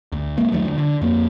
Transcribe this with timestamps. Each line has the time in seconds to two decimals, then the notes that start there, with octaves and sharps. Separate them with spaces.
0.12 D2
0.38 B1 G#2 G#3 A#3
0.52 D#2 D#3 F#3 A3
0.65 D2
0.78 D3
1.02 F2 A#3